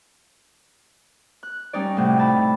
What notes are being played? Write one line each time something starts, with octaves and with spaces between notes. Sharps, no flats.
F#6
G3 C#4 D#4 D5
A2 C3 F#5
E4 A5 B5